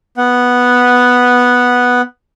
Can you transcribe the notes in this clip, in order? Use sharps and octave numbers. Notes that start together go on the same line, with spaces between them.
B3 F#5